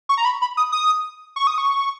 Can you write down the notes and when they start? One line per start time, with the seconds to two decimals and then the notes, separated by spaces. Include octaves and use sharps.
0.09 C#6
0.17 A#5
0.25 B5
0.42 B5
0.57 D#6
0.72 D#6
1.36 C#6
1.47 D#6
1.58 C#6